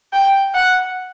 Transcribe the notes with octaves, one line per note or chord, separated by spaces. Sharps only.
G5
F#5